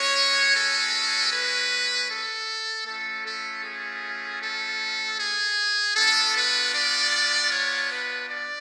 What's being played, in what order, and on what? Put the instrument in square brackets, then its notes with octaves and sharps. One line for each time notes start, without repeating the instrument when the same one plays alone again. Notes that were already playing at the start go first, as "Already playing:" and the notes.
Already playing: [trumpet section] G#3 C#4 F#4 C#5
A4
B4
A4
A3 C#4 F4 A4
A4
G#4
A4
G#4
B3 D4 F4 A4
B4
D5
C#5
B4
D5